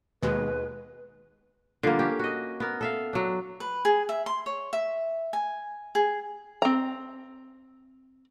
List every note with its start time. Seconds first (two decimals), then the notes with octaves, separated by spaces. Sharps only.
0.22 D#2 B2 G#3 B4
1.83 D3 F3 G3 A#3
1.99 C#4 G4
2.19 F#4 D#5
2.60 B3 A#4
2.81 A4 E5 F5
3.13 F#3 D4
3.60 B4
3.85 G#4
4.09 E5
4.26 C6
4.46 C#5
4.73 E5
5.33 G#5
5.95 G#4
6.62 C4 A#5